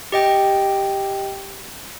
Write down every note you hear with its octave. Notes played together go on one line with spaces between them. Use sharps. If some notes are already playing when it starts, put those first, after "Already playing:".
G4 D#5 G5